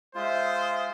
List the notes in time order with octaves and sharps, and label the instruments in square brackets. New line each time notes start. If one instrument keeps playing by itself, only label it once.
[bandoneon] G#3 F4 [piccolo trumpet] C5 [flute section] E5 D#6